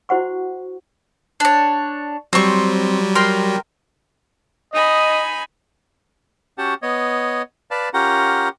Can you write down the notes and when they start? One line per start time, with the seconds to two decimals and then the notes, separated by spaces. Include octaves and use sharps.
0.09 E4 F#4 C5 F#5 C#6
1.40 D4 C#5
2.33 F#3 G3 C4 C#6
3.15 A#4 G5 C6
4.73 D#4 D#5 G#5 B5
6.58 C#4 F#4 G4 F#5 A5
6.82 B3 C#5 D#5
7.71 B4 D5 F5 A5
7.94 C#4 F4 G4 A#4 F#5 A#5